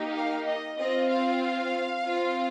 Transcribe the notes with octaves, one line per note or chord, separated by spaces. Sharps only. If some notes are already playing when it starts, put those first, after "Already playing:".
Already playing: A#3 D#4 G4
F5
D#5
C4 F4 D#5
F5
C4 F4